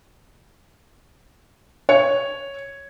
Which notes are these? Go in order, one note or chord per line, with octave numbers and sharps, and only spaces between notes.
C#5